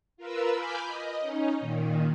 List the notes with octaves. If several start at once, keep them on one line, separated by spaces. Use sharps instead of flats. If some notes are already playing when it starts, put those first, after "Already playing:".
F4 A#4 B4 E6
G#5 B5 D6 F6 G6
D#5
C#4 D#4
A#2 D#3